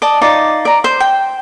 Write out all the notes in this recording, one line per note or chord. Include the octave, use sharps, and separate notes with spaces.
D5 D#5 A5
D#4 F4 D5
D5 A#5
C5
G5